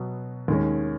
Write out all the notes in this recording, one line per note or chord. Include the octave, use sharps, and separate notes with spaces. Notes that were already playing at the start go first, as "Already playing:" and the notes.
Already playing: B2 F#3 B3
D#2 D#3 G#3 C#4